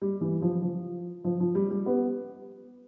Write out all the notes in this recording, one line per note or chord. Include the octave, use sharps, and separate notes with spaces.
G3
E3
F3
F3
F3
F3
G3
G3
B3